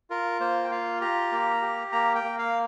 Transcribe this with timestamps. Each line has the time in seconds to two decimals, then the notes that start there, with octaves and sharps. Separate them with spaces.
0.10 F4 A#4
0.40 A#3 C5
0.64 G5
0.71 F4 F5
1.01 G4 A#5
1.32 A#3
1.62 G4
1.92 A#3 A#5
2.15 G5
2.24 A#3
2.39 F5